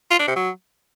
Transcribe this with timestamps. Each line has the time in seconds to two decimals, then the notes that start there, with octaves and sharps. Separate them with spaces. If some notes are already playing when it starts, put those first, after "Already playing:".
0.11 F4
0.19 D4
0.28 C3
0.36 F#3